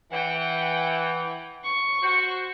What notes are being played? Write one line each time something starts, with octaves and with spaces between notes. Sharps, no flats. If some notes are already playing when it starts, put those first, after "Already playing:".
E3 F#5 G5
C#6
F#4 C5